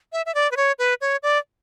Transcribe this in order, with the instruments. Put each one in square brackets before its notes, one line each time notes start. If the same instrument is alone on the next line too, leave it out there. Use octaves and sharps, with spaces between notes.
[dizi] E5
E5
D5
B4
C#5
B4
C#5
D5